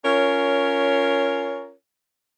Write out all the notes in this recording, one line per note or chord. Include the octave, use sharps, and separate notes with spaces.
C#4 F4 A#4 C#5